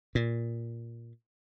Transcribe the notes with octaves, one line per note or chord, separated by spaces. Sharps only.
A#2